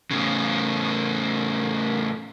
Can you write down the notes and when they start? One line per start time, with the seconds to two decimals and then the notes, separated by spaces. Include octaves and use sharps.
0.11 A2 C#3